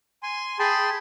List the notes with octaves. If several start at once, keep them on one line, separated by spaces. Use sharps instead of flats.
G#5 C6
G#4 G5 A5 B5 C6